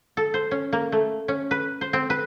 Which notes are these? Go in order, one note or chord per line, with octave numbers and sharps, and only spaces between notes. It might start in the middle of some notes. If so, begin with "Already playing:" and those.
A4
C5
C#4
A#3
A3
C#4
B4
C5
C4
B4